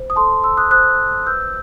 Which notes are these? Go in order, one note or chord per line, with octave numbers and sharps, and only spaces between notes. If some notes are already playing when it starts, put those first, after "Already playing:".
Already playing: C5
D#6
A4 A5 C6
A4 C6 E6
D#6 F#6
C5 D#6 F#6
C5
B4 E6 G6